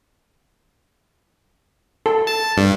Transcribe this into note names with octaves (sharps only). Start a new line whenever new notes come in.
A4
A5
G2